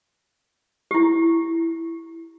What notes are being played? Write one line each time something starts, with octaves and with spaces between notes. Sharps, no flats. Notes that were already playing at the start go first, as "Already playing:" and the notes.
E4 G4